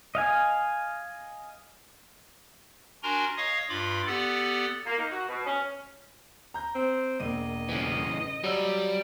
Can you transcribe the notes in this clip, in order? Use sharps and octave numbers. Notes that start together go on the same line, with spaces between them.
D#5 F5 G#5
D4 F#4 A#4 G#5 A#5 C6
C#5 D#5 F5 C#6 D#6
G2 F4 B5 D6
B3 G4 A4 D5 F#5
A#3
D#4
F#4
B2
C#4
A#5 G6
C4
E1 A#3 D#5 D#7
C#3 E3
F#3 G3 E6